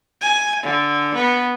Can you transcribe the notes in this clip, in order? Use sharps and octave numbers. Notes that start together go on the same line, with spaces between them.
G#5
D3
B3